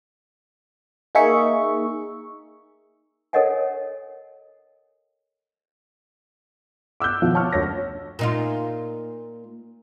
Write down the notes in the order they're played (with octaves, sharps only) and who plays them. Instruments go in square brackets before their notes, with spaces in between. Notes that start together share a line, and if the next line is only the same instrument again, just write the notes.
[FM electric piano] A#3 D#4 G#4 E5 C#6
[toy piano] A4 A#4 C#5 D#5 F#5 G#5
[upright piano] D6 E6 F#6 G6
B2 D#3 F3 F5
C#5 A5 C#6 F6
F#1 D2 C#5 A#6
[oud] A#2 D#4 F4